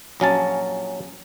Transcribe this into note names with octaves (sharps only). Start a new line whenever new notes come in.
A#1 F#3 C#4 A5